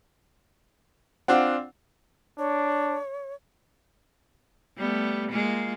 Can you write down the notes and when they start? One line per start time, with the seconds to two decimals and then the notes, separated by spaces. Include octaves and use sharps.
1.28 C4 D4 F4 F#5
2.38 D4 C#5
4.77 G3 A3 B3
5.31 G#3 A#3 F4